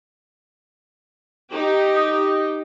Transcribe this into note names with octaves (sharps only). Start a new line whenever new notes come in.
D#4 G4
D#5